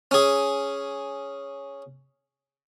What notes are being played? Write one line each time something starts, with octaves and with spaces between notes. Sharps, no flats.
C#4 G#4